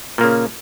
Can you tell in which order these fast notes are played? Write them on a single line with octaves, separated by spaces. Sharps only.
A#2 A#3 C#3